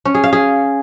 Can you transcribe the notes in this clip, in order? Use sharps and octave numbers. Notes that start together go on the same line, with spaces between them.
C#4
G#4
F5
G#4